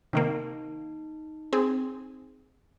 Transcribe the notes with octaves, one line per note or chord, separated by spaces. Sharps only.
C3 D#3 A#3 D#4
C4 G#4